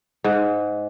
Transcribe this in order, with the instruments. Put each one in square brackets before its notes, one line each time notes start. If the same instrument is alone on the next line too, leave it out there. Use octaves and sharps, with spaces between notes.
[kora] G#2